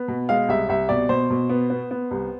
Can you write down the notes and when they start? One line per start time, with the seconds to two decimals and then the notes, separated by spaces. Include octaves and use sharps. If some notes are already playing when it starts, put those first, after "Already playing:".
Already playing: B3
0.08 B2
0.29 G#3 F5
0.48 C2 E5
0.69 C2 E5
0.89 B2 D5
1.09 B2 C5
1.30 B2
1.49 B3
1.70 B3
1.91 B3
2.11 C2